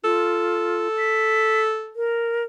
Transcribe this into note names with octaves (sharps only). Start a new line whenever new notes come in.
F4 A4
B6
A#4